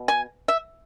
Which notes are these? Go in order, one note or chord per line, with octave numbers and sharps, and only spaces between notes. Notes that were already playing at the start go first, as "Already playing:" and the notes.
Already playing: B2
G#5
E5